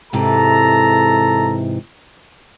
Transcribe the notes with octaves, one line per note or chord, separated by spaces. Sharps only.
G#2 C3 E3 A4 A#5